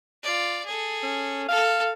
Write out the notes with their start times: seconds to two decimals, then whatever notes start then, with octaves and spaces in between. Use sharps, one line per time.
0.23 F4 D5
0.66 G#4 A4
1.03 C#4
1.49 A4 F5